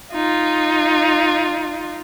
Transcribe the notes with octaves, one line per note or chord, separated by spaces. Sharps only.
D#4 F4